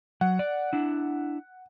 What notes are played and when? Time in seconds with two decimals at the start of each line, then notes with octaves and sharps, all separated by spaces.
0.21 F#3 F#5
0.39 D5
0.73 D4 E4